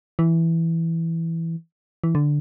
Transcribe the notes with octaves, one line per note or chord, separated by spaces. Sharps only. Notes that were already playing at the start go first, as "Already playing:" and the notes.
E3
E3
D3